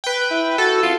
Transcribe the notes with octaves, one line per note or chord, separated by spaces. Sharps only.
B4 G5
E4
F#4 A4
F4